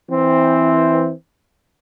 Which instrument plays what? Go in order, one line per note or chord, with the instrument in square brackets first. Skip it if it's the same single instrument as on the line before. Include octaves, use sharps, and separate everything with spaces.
[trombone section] E3 C4